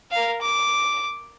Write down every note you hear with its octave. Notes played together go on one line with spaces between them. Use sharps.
A#4 F5
D6